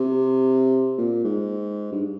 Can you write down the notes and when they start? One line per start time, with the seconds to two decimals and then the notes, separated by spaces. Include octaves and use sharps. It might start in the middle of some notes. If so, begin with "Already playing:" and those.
Already playing: C3
0.98 A#2
1.24 G#2
1.92 G2